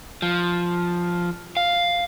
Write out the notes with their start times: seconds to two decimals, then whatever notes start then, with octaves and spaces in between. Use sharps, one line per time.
0.22 F3
1.57 F5